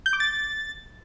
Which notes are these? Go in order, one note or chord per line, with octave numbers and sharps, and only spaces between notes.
G6
D6
A6